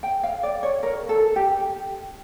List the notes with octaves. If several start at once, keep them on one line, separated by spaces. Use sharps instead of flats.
G5
F5
D5
C#5
A#4
A4
G4